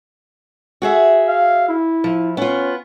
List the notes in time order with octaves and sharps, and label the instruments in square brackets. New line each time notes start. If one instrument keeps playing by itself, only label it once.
[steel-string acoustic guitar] F#4 G#4 E5
[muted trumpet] F5
E4
[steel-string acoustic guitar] F3
[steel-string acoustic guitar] B3 F4 [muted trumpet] C#4